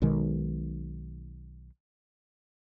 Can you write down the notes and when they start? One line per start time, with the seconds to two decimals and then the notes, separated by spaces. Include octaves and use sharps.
0.02 B1 B2 D#3 G#3